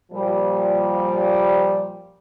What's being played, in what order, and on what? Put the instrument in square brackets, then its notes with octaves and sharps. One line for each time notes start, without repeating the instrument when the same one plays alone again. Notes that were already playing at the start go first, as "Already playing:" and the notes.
[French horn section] A#2 F3 G3